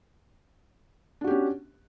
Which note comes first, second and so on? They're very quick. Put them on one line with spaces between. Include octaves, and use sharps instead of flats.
D4 F#4 G4 C#4